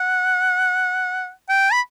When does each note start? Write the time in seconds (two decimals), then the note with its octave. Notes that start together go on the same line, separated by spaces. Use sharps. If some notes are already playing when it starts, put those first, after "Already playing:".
Already playing: F#5
1.49 G5
1.73 B5